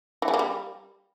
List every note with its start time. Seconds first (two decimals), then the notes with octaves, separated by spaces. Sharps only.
0.22 E3
0.28 C#3
0.34 A#3
0.39 G3